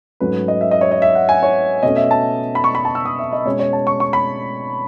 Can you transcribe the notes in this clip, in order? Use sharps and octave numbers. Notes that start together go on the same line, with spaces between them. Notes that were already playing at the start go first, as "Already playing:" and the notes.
G#2 F#3 A3 C#4 B4
D#5
E5
D#5
C#5
D#5
E5
F#5
G#5
C#5
B2 A3 C#4 D#5
E5
A5
B5
C#6
B5
A5
E6
D#6
E5
D#5
B2 G#3 C#4 C#5
C#5
A5
C#6
C#6
B5